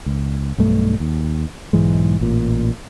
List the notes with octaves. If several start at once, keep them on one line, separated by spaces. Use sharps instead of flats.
C#2
B1 G2 A3
D#2
B1 G#2 E3 G#3
A1 A#2